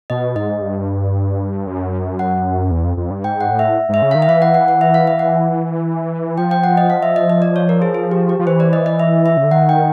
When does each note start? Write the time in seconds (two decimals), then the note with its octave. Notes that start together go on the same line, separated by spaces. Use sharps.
0.10 B2 D#5
0.36 G#2 D#5
0.62 G2
1.67 F#2
2.19 F#5
2.71 E2
2.84 F2
2.97 F2
3.11 G2
3.24 G#2 G5
3.41 F#5
3.50 A2
3.59 E5
3.89 G#2 E5
4.02 C#3
4.11 F5
4.15 D#3
4.22 E5
4.28 E3 F5
4.42 F#5
4.54 F#5
4.68 F#5
4.81 E5
4.94 F5
5.07 E5
5.19 F#5
6.38 F3 G5
6.51 G5
6.64 F#5
6.77 D#5
6.90 F5
7.03 E5
7.16 D#5
7.30 D#5
7.42 D5
7.56 C#5
7.69 A#4
7.82 G#4
7.95 G#4
8.11 G4
8.29 G4
8.39 F3
8.47 E3 C5
8.60 D5
8.73 D#5
8.86 D#5
9.00 E5
9.26 E5
9.37 C#3
9.44 D3
9.51 D#3 F#5
9.69 G5